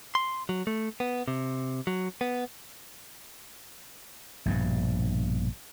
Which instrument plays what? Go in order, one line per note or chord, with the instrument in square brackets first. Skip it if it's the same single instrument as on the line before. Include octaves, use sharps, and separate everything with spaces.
[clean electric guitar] C6
F#3
A3
B3
C3
F#3
B3
[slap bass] A#1 G2 B2